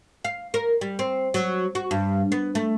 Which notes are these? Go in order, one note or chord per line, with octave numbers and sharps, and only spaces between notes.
F5
A#4
G3
C4
F#3
F#4
G2
B3
A3